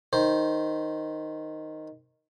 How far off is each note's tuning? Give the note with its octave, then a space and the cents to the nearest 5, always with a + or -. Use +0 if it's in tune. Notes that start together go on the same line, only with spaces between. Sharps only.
D#3 +0 C5 +0